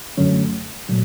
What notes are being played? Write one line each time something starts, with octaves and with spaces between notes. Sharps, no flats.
F#2 D3 F#3 A3 C#4
A#2 F#3 A3